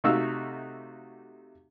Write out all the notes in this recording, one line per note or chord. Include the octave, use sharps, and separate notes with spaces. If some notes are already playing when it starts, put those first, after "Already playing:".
C3 A3 D#4 F#4 F5 E6